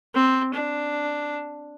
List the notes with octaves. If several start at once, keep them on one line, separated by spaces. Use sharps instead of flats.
C4
D4